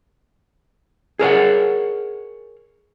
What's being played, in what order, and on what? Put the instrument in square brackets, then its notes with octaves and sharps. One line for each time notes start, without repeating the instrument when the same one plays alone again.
[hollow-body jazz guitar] G#4 A#4 C#5 F#5